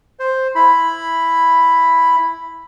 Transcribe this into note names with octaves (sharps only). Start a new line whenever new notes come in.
C5
E4 B5